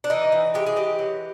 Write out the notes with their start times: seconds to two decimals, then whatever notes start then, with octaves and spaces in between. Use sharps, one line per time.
0.04 D4
0.10 E3 D#4
0.32 E3
0.54 G#3 G4
0.66 G#4
0.76 E3 G4
0.99 F#3